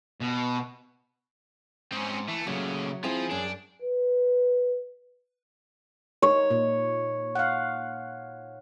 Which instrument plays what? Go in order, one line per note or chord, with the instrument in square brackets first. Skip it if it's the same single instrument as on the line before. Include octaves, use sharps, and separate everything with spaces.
[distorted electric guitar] B2
[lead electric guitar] G#2 [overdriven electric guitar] C4 C#4
[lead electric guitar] E3 [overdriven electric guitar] A3
[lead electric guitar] A#2 A3 [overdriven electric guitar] C#3 [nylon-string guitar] F#3
[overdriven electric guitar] F3 [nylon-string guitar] C4 E4 [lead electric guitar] G#4
[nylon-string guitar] F#2 C#4 [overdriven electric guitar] D4
[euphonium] B4
[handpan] D#4 [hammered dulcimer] C#5
[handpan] A#2
F5 F#5